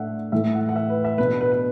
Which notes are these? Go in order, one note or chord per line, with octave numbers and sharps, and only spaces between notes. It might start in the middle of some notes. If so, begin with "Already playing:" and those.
Already playing: A2 A3 D4 E5 F#5
A2 E3 A3 E5
F#5
F#5
E5
B4
E5
B2 B3 D4 B4
B4
B4